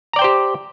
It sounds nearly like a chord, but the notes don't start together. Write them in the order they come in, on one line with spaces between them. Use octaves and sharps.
A#5 D5 G5 C5 G4